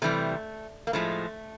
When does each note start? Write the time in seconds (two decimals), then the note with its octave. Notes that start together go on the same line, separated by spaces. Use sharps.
0.02 C3 E3 G3 A3
0.87 A#3
0.93 A2 F3 G#3 A3